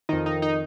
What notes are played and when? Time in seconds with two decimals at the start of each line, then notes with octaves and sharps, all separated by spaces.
0.09 F2 D#3 D#4
0.26 D#4
0.42 D#4